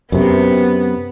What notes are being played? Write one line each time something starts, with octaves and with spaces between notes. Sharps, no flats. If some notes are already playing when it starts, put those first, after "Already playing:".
F#2 C3 B3